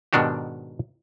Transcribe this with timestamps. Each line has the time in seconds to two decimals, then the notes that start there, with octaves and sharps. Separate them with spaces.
0.13 G#2 B2 D#3 D4 F#4 G4